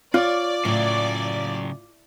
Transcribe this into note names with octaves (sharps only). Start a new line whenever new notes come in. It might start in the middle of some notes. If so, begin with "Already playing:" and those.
F4 C#5 D5
A2 C#3 F#3